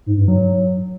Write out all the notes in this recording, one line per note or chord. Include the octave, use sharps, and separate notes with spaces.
G#2
G2
F#3